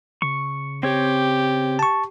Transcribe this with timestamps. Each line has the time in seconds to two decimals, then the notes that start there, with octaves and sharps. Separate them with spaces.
0.22 C#3 C#6
0.83 C4 G4 C#5
1.79 A5 C#6